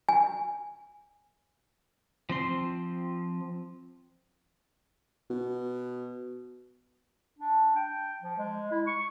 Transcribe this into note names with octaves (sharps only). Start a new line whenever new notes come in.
G#5
F3 C4 C6
B2
D4
G5
F3
G#3
E4
C#6